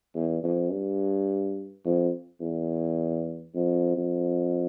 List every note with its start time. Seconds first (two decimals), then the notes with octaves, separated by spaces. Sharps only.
0.15 E2
0.43 F2
0.72 G2
1.85 F2
2.41 E2
3.55 F2
3.96 F2